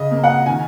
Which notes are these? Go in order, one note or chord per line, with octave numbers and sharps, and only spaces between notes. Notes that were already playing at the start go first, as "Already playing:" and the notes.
Already playing: C#3 D#5
A#3
F#5
D#3 G#5